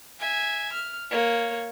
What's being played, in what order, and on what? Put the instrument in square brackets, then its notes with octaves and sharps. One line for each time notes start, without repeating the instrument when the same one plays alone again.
[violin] E5 G#5
F6
A#3 C#5